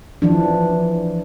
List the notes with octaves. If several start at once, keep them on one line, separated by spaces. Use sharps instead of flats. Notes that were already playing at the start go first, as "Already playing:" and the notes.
E3 F3 D4